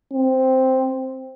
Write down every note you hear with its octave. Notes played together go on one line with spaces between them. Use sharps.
C4